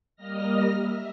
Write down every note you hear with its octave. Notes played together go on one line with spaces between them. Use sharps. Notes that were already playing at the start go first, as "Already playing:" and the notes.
G3 A#3 D#5 F6 A#6
E5